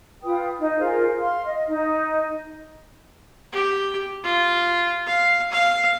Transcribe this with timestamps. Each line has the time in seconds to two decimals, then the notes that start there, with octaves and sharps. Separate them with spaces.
0.24 F4 B4 G5 D#6
0.59 D#4
0.79 F4 G#4 A#4 C5
1.19 F5 C6 F6
1.44 D#5
1.67 D#4
3.52 G4
4.23 F4
5.06 F5
5.51 F5